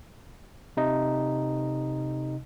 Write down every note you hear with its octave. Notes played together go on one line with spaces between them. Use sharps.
C3 D#4 D#5